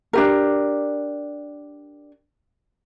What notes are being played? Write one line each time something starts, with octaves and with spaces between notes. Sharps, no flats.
D4 G4 A#4